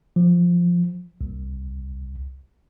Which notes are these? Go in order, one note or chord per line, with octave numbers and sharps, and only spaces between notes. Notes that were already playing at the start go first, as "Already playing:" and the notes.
F3
C2